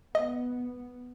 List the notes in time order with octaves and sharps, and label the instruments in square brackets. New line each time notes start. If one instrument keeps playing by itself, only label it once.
[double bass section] B3 [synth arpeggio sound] D#5